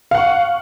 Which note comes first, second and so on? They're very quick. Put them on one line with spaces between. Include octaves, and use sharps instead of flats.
F5 F#5 C#6